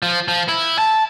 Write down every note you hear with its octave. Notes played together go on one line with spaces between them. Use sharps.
F3
F3
E4
A5